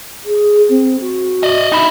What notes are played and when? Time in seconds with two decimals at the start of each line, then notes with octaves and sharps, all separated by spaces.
0.25 G#4
0.69 C4
1.01 F#4
1.43 D5 D#5
1.72 D#4 E4